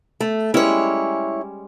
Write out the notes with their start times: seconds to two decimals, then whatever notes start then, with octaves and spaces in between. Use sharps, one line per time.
0.20 A3
0.54 G3 G#3 C#4 E4 C#5